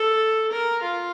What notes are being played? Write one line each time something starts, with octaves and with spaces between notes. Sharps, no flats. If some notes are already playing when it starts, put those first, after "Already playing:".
Already playing: A4
A#4
F4